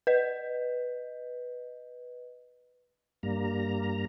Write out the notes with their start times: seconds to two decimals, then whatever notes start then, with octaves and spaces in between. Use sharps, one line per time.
0.07 B4 D#5
3.23 G2 G3 A#3 A#5